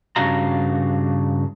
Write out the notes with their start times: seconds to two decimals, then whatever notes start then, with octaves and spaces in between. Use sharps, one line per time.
0.16 G2 C#3 D4 F#4 F5 A#5